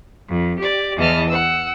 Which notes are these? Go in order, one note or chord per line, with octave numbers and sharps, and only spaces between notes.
F2
G4 D5
E2 E3 D#5 A5 F6
F#5 E6